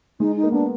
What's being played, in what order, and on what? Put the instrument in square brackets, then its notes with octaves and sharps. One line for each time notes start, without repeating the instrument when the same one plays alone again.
[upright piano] G#3 [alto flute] D#4
[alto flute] D#4
[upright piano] A#3
[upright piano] B3 [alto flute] D4